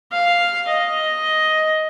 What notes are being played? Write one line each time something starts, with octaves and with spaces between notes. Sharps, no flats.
F5
D#5